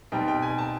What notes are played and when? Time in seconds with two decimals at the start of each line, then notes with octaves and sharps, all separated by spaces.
0.12 B2 G3 C4 D#4 G5
0.28 G5
0.42 G#5
0.58 A5